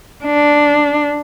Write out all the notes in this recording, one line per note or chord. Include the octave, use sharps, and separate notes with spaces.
D4